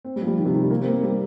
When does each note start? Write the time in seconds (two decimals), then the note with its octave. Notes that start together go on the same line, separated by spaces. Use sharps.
0.05 C4
0.16 G3
0.22 F3
0.27 G3
0.37 D#3
0.46 C3
0.54 D#3
0.62 G3
0.71 A#3
0.82 C4
0.87 A#3
0.92 C4
1.03 G3